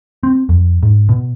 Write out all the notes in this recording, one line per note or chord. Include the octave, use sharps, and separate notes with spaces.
C4
F2
G#2
B2